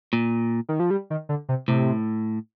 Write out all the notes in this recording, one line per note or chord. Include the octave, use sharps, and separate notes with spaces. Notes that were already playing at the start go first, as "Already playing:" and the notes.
A#2
D#3
F3
G3
D#3
D3
C3
A2 C3